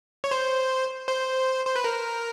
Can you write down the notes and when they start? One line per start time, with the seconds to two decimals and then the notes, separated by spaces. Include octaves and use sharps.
0.24 C#5
0.31 C5
1.08 C5
1.66 C5
1.76 B4
1.84 A#4